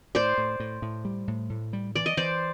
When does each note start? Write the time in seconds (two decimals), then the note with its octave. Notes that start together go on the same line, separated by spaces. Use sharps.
0.15 A2 C5 D5
0.38 A2
0.60 A2
0.82 A2
1.05 G3
1.28 A2
1.50 A2
1.73 G3
1.96 E3 D5
2.06 D#5
2.17 E3 C5 D5